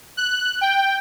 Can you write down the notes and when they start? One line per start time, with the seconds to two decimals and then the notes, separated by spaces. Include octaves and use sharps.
0.17 F#6
0.61 G5